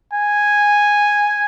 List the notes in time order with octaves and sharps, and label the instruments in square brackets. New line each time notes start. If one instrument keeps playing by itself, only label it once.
[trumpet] G#5